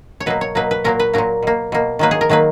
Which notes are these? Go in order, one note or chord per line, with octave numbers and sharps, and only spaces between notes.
C#5
B2 F#3 A#3 B4
C#5
B2 F#3 A#3 B4
B4
A#2 F#3 A#3 A#4
B4
A#2 F#3 A#3 A#4
B2 A#3
B2 A#3
D#3 F#3 A#3 B4
G#4
A#4
D#3 F#3 A#3 B4